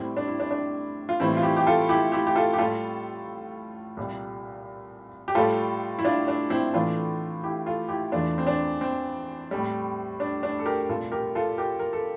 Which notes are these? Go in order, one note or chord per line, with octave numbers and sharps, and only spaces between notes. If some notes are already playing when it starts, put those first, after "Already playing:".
Already playing: A2 G3 C4 E4
D4
E4
D4
D4
F4
A2 E3 G3 C4 E4
F4
E4 G4
G4
F4 A4
E4 G4
E4 G4
G4
F4 A4
G4
A2 G3 F4 A4
C2 A#2 G3
G4
A2 G3 F4 A4
E4
D4 F4
D4
C4 E4
A2 E3 A3 D4 F4
E4 G4
F4 A4
E4 G4
E2 E3 A3 D4 F4
C4
D4
C4
A2 G3
D4
D4
A4
G4 A#4
C2 A#2 A3 F4 A4
G4 A#4
F4 A4
G4 A#4
A#4
A4